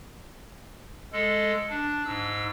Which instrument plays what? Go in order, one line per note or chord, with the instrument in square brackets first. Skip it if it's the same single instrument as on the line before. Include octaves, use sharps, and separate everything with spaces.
[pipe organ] G#3 A4
D4
G#2 E6